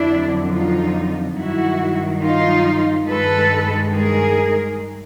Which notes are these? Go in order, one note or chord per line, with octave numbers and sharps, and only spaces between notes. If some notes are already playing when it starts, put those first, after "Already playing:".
Already playing: F2 D3 F#3 D4 E4
D#4 F4
G2 D#3 F#3 E4 F#4
D#4 F4
G2 D#3 G#3 A4 B4
G#4 A#4